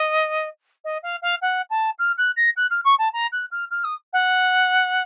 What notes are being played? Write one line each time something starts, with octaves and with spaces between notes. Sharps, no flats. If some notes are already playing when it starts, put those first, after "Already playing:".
Already playing: D#5
D#5
F5
F5
F#5
A5
F6
F#6
A#6
F#6
F6
C#6
A5
A#5
F#6
F6
F6
D#6
F#5